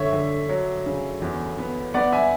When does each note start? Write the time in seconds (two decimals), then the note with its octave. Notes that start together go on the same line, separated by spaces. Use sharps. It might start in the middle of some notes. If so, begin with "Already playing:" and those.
Already playing: D3 C#5 E5
0.13 D3
0.49 F#3
0.86 C#3
1.22 E2
1.58 B3
1.94 B3 D5 F#5
2.12 E5 G#5